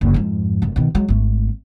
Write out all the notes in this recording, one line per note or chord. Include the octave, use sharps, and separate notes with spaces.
F#1 D#2
F2 G#2
F1 F#2
B2 D#3
F#3 G#3
G#1 A3